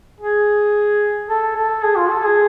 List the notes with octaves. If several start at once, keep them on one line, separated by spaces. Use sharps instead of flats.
G#4
A4
A4
G#4
F4
A4
G#4